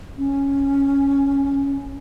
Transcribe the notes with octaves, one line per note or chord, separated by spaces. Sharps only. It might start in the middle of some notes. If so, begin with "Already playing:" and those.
C#4